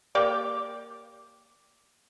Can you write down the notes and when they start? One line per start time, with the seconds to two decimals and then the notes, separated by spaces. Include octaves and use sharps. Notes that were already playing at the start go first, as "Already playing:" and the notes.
0.15 A#3 G4 D5